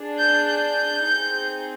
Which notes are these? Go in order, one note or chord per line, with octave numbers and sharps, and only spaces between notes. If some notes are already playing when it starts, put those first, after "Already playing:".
Already playing: D4 G#4
G6
G6
C4 D#4 G#4